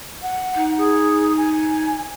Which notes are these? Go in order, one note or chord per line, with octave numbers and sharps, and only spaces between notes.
F#5
D#4
G#4
G#5